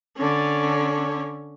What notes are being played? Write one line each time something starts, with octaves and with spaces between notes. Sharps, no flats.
D3 C#4